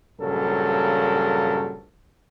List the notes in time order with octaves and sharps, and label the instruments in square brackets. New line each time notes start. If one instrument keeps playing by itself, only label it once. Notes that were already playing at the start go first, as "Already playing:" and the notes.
[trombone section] A#1 G2 C#3 F#3 A4 A#4